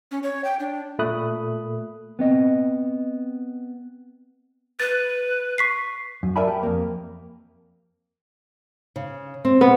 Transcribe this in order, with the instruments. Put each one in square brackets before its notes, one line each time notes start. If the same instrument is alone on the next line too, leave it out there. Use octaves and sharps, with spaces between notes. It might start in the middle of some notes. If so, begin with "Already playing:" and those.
[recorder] C#4
C#5
G5
D4
[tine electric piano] A#2 A3 B5 D#6 F#6
[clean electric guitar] B3 C4 D#5
[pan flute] B4 [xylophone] A6
[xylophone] C#6 B6 C7
[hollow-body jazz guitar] F#2
A#4 D5 E5 G#5 A5 B5
G4
F2 A#3
[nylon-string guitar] C#3
C4
[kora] B3